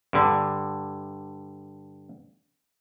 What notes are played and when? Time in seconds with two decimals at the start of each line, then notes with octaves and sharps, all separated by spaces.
0.13 G2 D3